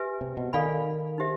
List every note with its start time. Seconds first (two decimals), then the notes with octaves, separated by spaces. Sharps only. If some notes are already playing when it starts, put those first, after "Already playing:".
Already playing: G4 B4 E5 G#5
0.21 C3
0.37 B2
0.53 D#3 A4 D5 F5 G#5 B5
1.18 D#4 G4 C5 E5